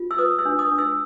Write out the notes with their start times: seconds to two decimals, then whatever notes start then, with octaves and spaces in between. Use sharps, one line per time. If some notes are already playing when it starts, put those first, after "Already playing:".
Already playing: F4
0.11 E6
0.18 B4 D#6
0.39 E6
0.45 D4
0.59 D#6
0.72 D4
0.78 E6